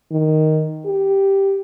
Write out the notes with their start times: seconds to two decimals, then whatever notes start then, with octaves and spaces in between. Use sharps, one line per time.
0.12 D#3
0.86 G4